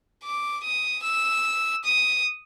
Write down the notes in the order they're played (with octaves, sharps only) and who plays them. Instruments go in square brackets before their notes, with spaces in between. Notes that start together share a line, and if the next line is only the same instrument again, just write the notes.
[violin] D6
D#6
E6
D#6